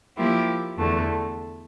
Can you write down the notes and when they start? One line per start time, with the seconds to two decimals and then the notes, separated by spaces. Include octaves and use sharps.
0.18 F3 A#3 E4 G4
0.78 E2 D3 A3